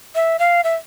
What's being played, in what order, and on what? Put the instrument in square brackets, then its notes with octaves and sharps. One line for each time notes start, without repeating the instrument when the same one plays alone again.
[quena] E5
F5
E5